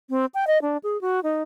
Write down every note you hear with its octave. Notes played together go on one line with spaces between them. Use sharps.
C4
G5
D#5
D4
G#4
F#4
D#4